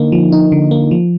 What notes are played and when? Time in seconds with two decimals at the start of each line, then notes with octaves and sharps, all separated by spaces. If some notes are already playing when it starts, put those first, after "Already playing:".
Already playing: D3 A#3 D#4
0.12 F3
0.32 D#4
0.52 D3
0.71 A#3
0.91 F3